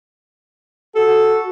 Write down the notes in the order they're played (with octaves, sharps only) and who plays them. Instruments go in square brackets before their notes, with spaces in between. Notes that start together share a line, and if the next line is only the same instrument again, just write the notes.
[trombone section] F#4 [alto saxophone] A4